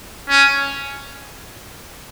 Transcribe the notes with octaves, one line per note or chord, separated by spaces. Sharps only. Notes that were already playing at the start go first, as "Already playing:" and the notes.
C#4